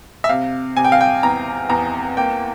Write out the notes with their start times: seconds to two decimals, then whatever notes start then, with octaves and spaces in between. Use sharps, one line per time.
0.24 E5
0.29 C3 F5
0.76 C3 G#5
0.84 G5
0.92 F5
1.01 G5
1.23 E2 A#5
1.70 E2 A#5
2.17 A#3 G5